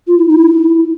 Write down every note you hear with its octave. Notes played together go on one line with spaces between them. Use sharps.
F4
E4
D#4
E4